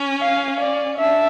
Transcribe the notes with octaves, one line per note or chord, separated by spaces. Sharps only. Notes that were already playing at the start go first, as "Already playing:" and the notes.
Already playing: C#4
F5
D5
D4 E5